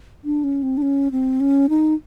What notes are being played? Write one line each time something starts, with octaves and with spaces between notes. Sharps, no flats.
D4
C#4
C4
D4
C#4
C4
C#4
D#4